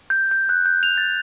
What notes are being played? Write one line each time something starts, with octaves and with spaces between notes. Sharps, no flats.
G6
G6
F#6
G6
F7
A6